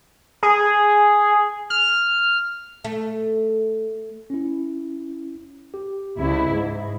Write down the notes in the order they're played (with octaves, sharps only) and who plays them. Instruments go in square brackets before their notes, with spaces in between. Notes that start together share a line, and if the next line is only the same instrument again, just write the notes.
[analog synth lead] G#4
F6
[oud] A3
[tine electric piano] C#4 E4
G4
[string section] C#2 E4
[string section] G#2 [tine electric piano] G#3